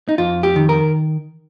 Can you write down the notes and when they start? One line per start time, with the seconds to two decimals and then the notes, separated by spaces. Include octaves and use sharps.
0.09 D#4
0.18 F2 F4
0.43 G4
0.56 D#3
0.69 A#4